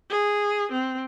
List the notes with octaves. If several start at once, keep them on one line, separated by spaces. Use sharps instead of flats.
G#4
C4